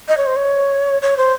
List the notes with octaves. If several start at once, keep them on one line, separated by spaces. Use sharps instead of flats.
D#5
C#5
C5
C#5
C#5
C5